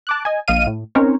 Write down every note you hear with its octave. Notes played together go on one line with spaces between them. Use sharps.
A5 D6 F#6
D#5 G#5
A#1 D#5 F5 F6 D#7
A2
C4 C#4 D#4 A#4 C5 C#5